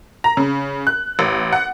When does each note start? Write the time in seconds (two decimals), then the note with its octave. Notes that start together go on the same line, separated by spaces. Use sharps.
0.24 A#5
0.37 C#3
0.87 F#6
1.19 A1
1.53 F#5